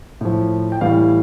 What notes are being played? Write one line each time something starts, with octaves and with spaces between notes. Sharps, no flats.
A2 F3
G5
A2 E3 G3 F5